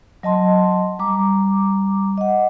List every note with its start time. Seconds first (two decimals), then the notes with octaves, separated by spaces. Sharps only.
0.23 F#3 D#5 A5 C6
0.99 G3 A#5 D6
2.18 D#5 F#5